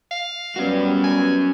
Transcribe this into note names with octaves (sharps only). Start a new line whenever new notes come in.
F5
G3 B3 C#4 F#4
G#5